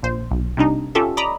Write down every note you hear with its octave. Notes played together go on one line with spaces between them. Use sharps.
A#1 C5
B1
C3 G3 D4 D#4
C#4 F4 G4 A4 E5
D5 D#5 A#5 B5